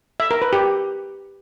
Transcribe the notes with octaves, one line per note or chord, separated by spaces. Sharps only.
E5
A#4
B4
G4